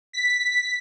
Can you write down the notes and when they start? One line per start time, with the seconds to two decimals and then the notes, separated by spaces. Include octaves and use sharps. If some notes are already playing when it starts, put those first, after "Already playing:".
0.13 B6